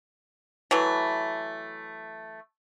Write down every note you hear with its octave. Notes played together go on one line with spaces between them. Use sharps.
E3 F#3 A3